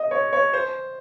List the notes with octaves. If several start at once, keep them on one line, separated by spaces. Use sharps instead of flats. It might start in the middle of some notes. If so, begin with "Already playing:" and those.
Already playing: D#5
C#5
C#5
C5